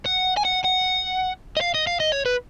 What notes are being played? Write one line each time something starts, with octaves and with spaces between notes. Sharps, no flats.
F#5
G#5
F#5
F#5
D#5
F5
D#5
F5
D#5
C#5
B4